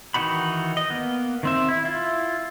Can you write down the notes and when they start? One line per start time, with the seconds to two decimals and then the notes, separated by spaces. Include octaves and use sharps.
0.14 D#3 E3 D#4 F#4 B5
0.77 D#5
0.90 A#3 B3
1.43 D#3 C4 E5
1.69 E4
1.85 E4 F4